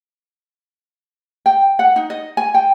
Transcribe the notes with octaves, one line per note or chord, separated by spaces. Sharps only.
G5
F#5
D#4
D#5
G#5
G5